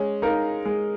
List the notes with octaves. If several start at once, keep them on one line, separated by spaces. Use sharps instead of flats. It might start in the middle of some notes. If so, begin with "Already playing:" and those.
Already playing: G#3 C#4
D#4 A#4 F5
G#3